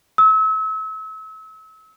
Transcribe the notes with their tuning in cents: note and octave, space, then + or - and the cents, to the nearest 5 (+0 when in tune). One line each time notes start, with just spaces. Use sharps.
E6 -35